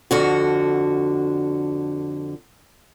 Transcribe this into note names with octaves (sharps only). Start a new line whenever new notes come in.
F2 D3 F#4